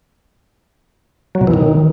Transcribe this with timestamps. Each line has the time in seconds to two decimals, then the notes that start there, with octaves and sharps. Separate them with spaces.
1.35 F#3
1.41 B2
1.47 E3
1.54 D#3